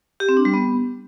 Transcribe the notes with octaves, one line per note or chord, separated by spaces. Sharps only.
G4
C4
D4
G3
B3